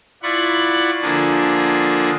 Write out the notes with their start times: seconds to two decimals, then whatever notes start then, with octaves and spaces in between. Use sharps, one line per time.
0.23 E4 F4 D5 F#5 B5 C#6
1.02 D3 F3 A#3 D4 F4 G#4